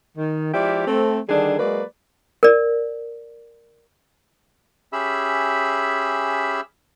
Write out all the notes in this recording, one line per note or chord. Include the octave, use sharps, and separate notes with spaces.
D#3
F3 G#3 E4 G4 D5
A3 C4
D3 D#3 G3 D4 G#4
F#3 G#3 A#3 B4 D5
A#4 D5
C#4 G4 G#4 E5 B5 E6